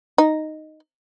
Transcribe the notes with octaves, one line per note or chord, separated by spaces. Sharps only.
D#4